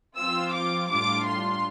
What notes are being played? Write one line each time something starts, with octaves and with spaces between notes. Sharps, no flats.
F3 C4 F4 E6
D6
A2 G3 D4 F4 D6
C6